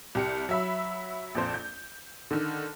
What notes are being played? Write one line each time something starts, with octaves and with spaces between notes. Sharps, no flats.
C2 G4 C#7
F#3 E5 B5
A#1 F2 C5
G6
D3 D#3